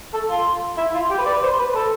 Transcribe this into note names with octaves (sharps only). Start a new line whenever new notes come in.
A4
F4
E4
F4
G4
B4
D5
B4
C5
B4
A4